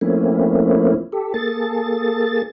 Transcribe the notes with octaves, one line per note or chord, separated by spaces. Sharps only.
F3 A3 A#3 C4 C#4 E4
G4 A4
A#3 G#4 A4 A6